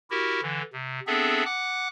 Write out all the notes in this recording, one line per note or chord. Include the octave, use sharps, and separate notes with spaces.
E4 F#4 G4 A#4
D3 E3
C3
B3 C4 D4 G#4 A4 E5
F#5 D6 F#6